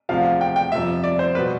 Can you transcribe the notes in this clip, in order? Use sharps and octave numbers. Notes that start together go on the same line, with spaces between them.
E1 D2 C3 F3 F5
G5
G5
G1 F2 C3 F3 E5
D5
C5
B2 G3 B4